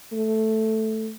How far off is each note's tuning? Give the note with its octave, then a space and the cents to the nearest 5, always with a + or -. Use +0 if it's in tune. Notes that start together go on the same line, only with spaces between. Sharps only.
A3 +0